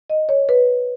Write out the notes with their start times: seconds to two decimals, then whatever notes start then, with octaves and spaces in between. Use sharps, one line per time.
0.10 D#5
0.29 C#5
0.49 B4